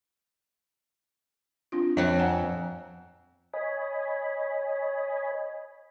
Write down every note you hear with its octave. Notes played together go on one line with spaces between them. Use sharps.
C4 D4 F4
F2 C#5
F#5 G#5 A#5
C#5 D#5 G#5 B5